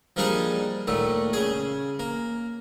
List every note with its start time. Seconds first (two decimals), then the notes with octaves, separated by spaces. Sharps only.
0.16 F3 G3 A#3 D4 D#4 G#4
0.87 D#2 A#2 A3
1.33 C#3 G#4
1.99 A#3